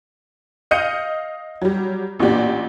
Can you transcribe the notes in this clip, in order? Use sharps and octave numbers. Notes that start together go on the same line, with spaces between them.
D#5 F5 G6 C#7 D#7
F#3 G3
A1 A#2 D4 F#4 G4 D5